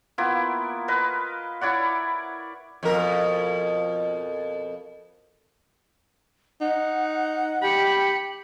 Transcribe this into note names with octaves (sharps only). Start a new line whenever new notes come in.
A#3 B3 E4 F4
A#4 B4 D#5 F5
E4 C#5 D5 F#5
F2 B2 A#4
D#4 F#5
G4 G5 B5 C#7